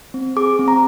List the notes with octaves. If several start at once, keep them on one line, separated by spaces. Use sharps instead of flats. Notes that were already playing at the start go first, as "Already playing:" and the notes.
C4
G#4 D6
C4
A#5